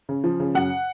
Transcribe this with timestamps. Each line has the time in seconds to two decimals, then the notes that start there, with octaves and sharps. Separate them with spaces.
0.09 C#3
0.24 F3
0.40 C#3
0.55 F#2 F#5